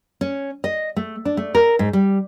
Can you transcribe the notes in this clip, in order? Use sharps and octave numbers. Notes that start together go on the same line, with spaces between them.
C#4
D#5
A3
D4
A3
A#4
G#2
G3